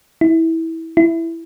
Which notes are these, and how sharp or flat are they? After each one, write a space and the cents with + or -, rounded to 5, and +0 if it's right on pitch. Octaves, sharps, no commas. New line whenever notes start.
E4 -20
E4 +5